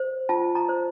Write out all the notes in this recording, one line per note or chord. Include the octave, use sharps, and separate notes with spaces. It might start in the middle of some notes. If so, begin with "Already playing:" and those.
Already playing: C5
F4 A5
A#5
C5